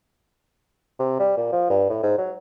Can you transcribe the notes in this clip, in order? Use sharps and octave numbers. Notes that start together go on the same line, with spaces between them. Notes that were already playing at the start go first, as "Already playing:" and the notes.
C3
G3
A#2
F3
G2
A2
G#2
F#3